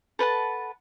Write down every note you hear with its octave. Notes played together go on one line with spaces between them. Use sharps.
A4 B4 F#5 A5